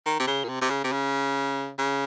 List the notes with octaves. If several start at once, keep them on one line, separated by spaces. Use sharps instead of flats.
D#3
C3
C#3
A#2
C3
C3
C#3
C3
C#3
C#3